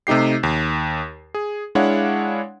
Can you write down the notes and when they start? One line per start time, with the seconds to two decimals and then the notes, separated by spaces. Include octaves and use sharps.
0.07 C3 A3 D#4 G4 C7
0.43 D#2
1.34 G#4
1.75 G#3 D4 E4 C#5 F5 F#5